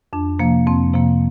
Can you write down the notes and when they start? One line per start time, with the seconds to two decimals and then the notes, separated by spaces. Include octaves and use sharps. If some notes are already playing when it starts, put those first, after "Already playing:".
0.13 F2 D4
0.39 C3 F3 A#3
0.67 F2 C4
0.93 C3 F3 A#3